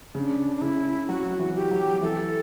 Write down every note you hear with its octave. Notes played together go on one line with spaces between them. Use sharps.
C#3 D4
D4
C#3 E4
F#3 F#4
E3
G4
F#3
E3 A4